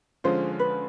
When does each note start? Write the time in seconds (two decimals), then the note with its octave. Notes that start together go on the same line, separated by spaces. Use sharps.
0.24 D3 F3 G#3 C#4 F4 C5
0.59 B4